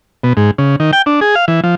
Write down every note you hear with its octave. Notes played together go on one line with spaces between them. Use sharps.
B2
G#2
C#3
D#3
G5
D4
G#4
F5
E3
F3